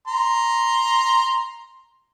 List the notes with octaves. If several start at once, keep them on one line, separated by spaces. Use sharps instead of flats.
A#5 C6